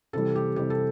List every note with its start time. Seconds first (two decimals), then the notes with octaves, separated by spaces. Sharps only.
0.13 C3 E3 G3 A4
0.35 G4
0.56 C3 E3 G3 G4
0.70 A4